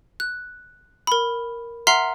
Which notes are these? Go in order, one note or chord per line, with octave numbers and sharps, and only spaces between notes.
F#6
A#4 B5
E5 F#5 A#5 C6 F6 C7